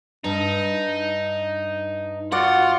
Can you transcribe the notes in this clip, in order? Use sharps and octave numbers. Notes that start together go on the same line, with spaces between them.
G2 D#4
F4 F#4 D5 F#5